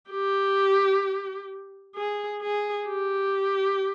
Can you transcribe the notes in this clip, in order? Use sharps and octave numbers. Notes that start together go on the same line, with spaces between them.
G4
G#4
G#4
G4